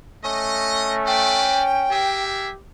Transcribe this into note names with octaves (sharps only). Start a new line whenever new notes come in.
A3 C#4 D#5
B4 C5 D5 G5
G4 G#4 A#4 E5